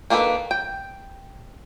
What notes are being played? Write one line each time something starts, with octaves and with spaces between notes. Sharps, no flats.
D#3 A#3 D4 A4 B4
G5